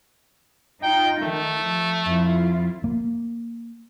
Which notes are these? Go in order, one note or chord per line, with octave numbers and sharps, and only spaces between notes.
D#4 F4 G5
D#3 A3
F3
F2 E4 F4
A#3